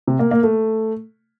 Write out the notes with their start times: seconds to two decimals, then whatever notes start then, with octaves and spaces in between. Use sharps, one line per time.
0.07 C3
0.19 A#3
0.31 A#3
0.43 A3